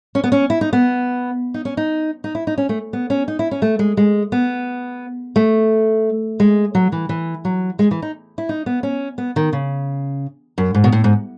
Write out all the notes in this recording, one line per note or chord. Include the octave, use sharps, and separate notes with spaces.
C#4
B3
C#4
E4
D#4
B3
D#4
C#4
D#4
D#4
E4
D#4
C#4
A3
B3
C#4
D#4
E4
C#4
A3
G#3
G#3
B3
A3
G#3
F#3
E3
E3
F#3
G#3
E3
D#4
E4
D#4
B3
C#4
B3
D#3
C#3
F#2
G#2
B2
A2
G#2